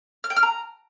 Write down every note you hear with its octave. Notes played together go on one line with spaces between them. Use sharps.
F6
G5
F6
A#5